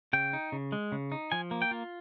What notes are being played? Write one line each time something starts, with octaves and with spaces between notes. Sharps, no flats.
C#3 G5
D#4
C#3
G#3
C#3
D#4
F3 G#5
A#3
G5
F4